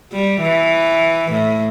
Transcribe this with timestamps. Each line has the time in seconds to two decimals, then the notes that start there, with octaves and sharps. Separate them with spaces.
0.12 G3
0.42 E3
1.31 A2